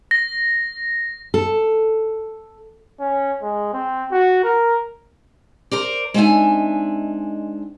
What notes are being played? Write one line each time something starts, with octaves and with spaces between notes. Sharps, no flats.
A#6
A4
C#4
G#3
C4
F#4
A#4
A#4 C5 D5
G#3 C4 D4 D#4 E5 G#5